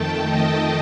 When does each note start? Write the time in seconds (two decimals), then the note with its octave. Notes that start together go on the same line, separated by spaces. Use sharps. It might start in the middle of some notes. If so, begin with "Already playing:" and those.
Already playing: F2 D#3 A3 G5 A5
0.26 D#5